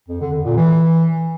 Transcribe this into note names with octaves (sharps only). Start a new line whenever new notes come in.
F2
D3
F2
A#2
E3